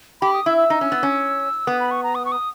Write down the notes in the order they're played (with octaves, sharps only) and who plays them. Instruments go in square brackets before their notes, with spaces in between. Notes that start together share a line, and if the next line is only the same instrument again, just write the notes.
[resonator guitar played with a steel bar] G4 [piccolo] B5
[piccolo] D#6
[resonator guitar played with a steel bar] E4 [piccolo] E6
[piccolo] E6
[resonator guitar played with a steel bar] D#4
C#4
B3
C#4
[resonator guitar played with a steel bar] B3 [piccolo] D#6
[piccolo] B5
C#6
A#5
D#6
C#6
D#6